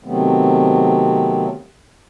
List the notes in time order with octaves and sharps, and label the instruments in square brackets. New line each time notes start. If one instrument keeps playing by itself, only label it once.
[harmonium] C3 D#3 F#3 A3 B3 C4